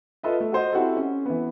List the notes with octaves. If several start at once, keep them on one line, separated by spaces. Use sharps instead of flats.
F4 A4 B4 D#5 E5
A3
F#4 C5 D#5
C4 E4 F#4 G4 A4
C#4
E3 B3